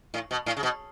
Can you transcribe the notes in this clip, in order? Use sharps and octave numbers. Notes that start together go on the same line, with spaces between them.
A2
B2
A2
C#3
B2